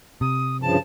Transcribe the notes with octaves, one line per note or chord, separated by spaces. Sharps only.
C3 D#6
G2 C#3 F3 A5